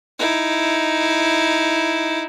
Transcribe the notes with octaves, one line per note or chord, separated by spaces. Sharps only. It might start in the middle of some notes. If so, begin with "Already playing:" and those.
D#4 E4